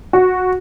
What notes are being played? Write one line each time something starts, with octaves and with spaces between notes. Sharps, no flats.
F#4